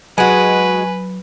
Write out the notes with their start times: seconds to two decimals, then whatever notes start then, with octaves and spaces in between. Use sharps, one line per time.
0.18 F#3 G#3 F#4 B4 G#5